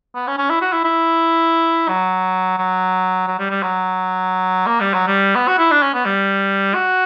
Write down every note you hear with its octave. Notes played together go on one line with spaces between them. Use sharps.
B3
C#4
C#4
E4
F#4
E4
E4
F#3
F#3
F#3
G3
G3
F#3
A#3
G3
F#3
G3
B3
F#4
E4
D4
C#4
B3
G3
F#4